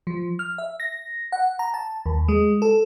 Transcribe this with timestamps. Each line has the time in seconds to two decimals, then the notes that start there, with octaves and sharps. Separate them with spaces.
0.07 F3
0.39 F6
0.58 E5
0.80 A#6
1.32 F#5
1.59 A#5
1.74 A5
2.06 D#2
2.28 G#3
2.62 A4